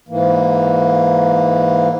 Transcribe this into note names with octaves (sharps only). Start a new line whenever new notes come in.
G#2 E3 A#3